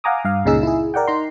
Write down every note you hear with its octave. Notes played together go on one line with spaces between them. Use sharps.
F5 F#5 G#5 A#5 D6 D#6
G2 F5
C#2 A#2 C#3 D#4 G#4 E6
E4 G#4
A#4 D5 F#5 G5
D#4 A#5 C6